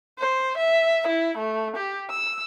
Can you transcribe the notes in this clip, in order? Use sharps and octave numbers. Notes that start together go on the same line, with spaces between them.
C5
E5
E4
A3
G4
E6